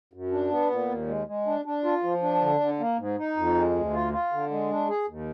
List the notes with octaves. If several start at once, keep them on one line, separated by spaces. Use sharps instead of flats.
F#2
D4
B3
A#2
D#2
G#3
G#3
D4
D4
F4
F3
D4
D3
D3
A#3
G#2
D#4
F2
G#3
D2
F4
F4
D3
G#3
D4
G#4
D#2